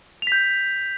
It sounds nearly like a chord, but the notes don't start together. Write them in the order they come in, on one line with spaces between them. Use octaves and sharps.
F7 B6 G6